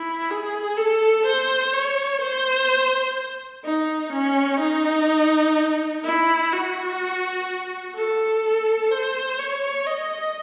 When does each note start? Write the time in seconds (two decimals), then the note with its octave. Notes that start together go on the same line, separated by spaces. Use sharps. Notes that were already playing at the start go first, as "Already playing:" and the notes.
Already playing: E4
0.30 G#4
0.77 A4
1.26 C5
1.73 C#5
2.21 C5
3.64 D#4
4.12 C#4
4.60 D#4
6.04 E4
6.52 F#4
7.95 A4
8.92 C5
9.39 C#5
9.86 D#5